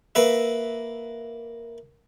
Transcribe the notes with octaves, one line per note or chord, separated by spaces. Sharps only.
A#3 B4 E5